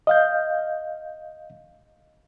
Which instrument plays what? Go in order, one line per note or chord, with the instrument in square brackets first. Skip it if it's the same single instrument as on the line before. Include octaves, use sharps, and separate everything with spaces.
[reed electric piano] D#5 F5 G6